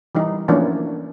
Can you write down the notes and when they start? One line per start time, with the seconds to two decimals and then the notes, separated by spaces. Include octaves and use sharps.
0.15 E3 G3 D#4
0.48 E3 F3 A3 A#3 C#4 D4